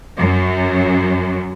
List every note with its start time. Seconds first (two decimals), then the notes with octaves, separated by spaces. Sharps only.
0.18 F#2